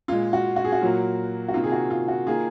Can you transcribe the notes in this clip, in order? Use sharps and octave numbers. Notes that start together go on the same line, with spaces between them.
A#2 G#3 F4
F#4
F#4
G#4
F#4
A#2 F#3 A#3
F#4
C3 D#3 A#3 F4
G#4
F#4
F4
F#4
D#3 A#3 F4 G#4